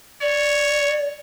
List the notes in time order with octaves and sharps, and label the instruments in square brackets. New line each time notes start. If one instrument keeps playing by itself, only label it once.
[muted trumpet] C#5 [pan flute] D5